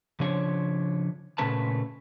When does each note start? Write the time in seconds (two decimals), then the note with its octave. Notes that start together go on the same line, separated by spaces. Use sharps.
0.20 C#3 F3 D4 C#5
1.38 A#2 C#3 A3 C#4 B4 A5